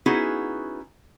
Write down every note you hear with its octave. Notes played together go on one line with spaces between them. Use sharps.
B3 C#4 D#4 E4 F#4 G#4